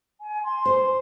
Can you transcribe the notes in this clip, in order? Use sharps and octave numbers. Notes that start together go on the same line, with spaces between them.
G#5
C6
C5